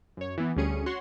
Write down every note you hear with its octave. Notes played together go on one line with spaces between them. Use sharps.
F#2 C#5
E3 B3
D2 G3 C#4 G#4 C#7 D#7
F#4 C#5 F#5 C6 C#6